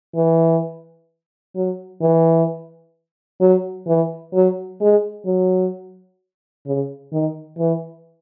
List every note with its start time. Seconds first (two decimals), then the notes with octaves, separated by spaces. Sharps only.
0.15 E3
1.55 F#3
2.01 E3
3.41 F#3
3.87 E3
4.34 F#3
4.81 G#3
5.26 F#3
6.66 C#3
7.12 D#3
7.59 E3